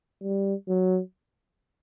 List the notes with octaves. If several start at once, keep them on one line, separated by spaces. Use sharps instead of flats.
G3
F#3